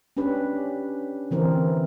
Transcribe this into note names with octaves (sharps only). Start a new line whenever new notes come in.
C#4 D4 G4 B4
D3 E3 C4 A#4